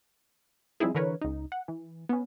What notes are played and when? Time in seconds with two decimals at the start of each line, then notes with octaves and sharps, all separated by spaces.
0.80 F3 G3 C4 D#4 E4 G#4
0.95 D3 E3 A#4 B4 C#5
1.21 C#2 D#4
1.52 F#5
1.68 E3
2.09 B3 C#4